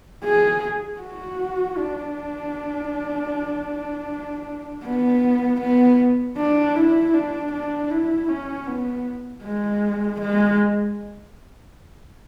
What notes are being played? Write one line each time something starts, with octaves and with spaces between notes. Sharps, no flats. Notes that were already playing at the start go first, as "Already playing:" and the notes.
G#4
F#4
D4
B3
B3
D4
E4
D4
D4
E4
C#4
B3
G#3
G#3